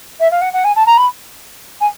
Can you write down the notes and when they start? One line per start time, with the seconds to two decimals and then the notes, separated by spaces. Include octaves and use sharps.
0.20 E5
0.31 F5
0.41 F#5
0.53 F#5
0.64 G#5
0.76 A5
0.86 A#5
0.97 B5
1.81 G#5